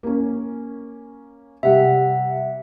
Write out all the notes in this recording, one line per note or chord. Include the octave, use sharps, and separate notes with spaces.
A#3 C#4
C3 G3 E5 F#5